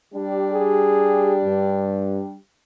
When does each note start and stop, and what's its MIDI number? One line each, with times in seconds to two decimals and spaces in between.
0.14 2.35 55
0.14 2.35 62
0.14 2.35 67
0.52 1.35 68
1.45 2.21 43